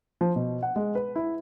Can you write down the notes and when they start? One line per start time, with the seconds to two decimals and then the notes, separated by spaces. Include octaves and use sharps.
0.21 F3
0.36 B2
0.63 F#5
0.76 G#3
0.95 B4
1.16 E4